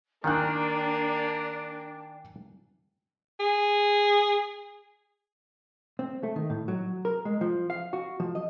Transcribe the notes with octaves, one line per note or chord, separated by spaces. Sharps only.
D#3 A#3 D4 G5 G#5 F#6
G#4
C4
A3
D#3
A2
F#3
A#4
G#3
F3
F5
F#4
F3
D#5